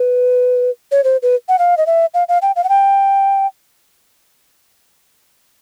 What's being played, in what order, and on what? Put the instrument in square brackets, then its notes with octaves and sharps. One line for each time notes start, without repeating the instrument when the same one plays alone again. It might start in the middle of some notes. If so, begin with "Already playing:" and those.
Already playing: [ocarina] B4
C#5
C5
B4
F#5
F5
D#5
E5
F5
F5
G5
F5
F#5
G5